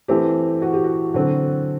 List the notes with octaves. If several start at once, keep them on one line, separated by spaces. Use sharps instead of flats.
E3 A3 C4 G4
F#4
G4
F#4
D3 F#3 C4 F#4